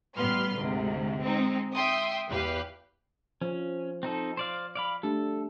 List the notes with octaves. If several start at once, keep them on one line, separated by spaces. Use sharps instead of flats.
A1 G3 B3 B4 C6 F6
D2 G#2 C3
G#3 C4 D#4
E5 G5 C6 D#6
E2 G4 B4 F5
F3 C#4
C4 D#4 A4
C5 D5 F5
D5 F5 B5
A3 D4 G4 A4